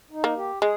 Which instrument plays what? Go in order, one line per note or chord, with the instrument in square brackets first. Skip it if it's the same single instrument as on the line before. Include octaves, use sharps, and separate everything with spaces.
[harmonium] D#4
[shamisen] A#3
[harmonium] G4
[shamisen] G#3 [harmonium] G#4